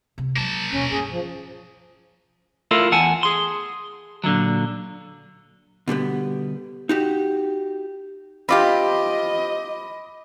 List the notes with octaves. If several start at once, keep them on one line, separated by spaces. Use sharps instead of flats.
C3 B3
F#3 G#3 A#3 A5
D#1 B2 C#4
G2 G#4
F3
A3 E4 F4 A4 A#4 F5
E2 F#5 G#5 A5
G#4 C6
A#2 D3 E3 F#3
B2 D3 G3 B3
D#4 F#4 G4
C4 F4 G4 D#5 B5 D6